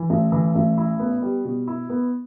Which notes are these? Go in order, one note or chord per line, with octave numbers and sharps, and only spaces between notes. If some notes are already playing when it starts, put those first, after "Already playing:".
Already playing: E3
A1
E3
A1
E4
B3
G3
B2
E4
B3